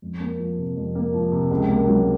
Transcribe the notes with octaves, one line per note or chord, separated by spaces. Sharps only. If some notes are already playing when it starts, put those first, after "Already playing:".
F2
A#3
F3
C3
F2
A#3
F3
C3
C#2
A#3
F#3